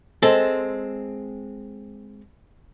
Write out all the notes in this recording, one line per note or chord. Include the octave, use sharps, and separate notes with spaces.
G#3 C4 A4